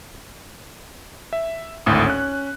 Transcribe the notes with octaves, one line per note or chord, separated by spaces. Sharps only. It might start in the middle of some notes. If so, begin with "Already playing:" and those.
E5
G#1 D2 A2 D#6
C#4 F#6